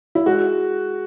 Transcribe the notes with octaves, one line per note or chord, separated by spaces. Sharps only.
E4
G#3 F#4